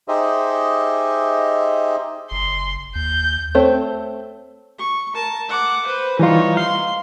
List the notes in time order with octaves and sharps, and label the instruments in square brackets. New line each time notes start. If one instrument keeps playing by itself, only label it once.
[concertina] D#4 G4 G#4 C5 D#5 E5
[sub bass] F#1 [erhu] C6
[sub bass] D#2 [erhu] G6
[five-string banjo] A3 C4 C#5
[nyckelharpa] C#6
A#4 A5
F#5 D6
B4 C5
[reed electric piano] E3 G3 F4 [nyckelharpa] D#4 C#5
[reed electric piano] F5 [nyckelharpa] C6